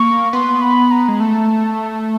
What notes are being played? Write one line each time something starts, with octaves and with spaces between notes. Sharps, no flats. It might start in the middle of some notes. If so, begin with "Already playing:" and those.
Already playing: A#3 C#6
B3 C6
B5
A#5
G#3
A3 A5